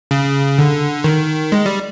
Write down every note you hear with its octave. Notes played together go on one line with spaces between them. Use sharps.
C#3
D3
D#3
G#3
G3